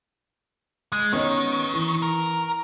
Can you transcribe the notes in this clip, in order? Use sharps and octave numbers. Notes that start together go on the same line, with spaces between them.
G#3
D#3 B3 C#4 D#4
E3
A#4